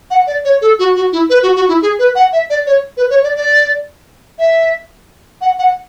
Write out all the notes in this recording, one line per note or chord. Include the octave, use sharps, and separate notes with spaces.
F#5
D5
C#5
A4
F#4
F#4
E4
B4
F#4
F#4
E4
G#4
B4
F#5
E5
D5
C#5
B4
C#5
D5
D5
E5
F#5
F#5